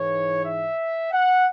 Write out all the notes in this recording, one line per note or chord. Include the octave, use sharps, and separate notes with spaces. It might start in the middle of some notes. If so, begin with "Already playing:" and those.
Already playing: G#2 E3 C#5
E5
F#5